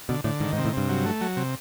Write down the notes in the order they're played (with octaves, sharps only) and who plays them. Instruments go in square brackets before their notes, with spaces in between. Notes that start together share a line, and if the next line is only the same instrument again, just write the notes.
[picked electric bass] B2 [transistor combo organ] D3
[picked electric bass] A2 [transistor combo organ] D3
[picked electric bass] G#2 [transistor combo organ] D#3
[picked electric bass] G#2
[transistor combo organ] C3
[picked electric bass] A2
[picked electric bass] G2 [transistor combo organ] C3
[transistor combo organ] F#3
A3
F#3
C3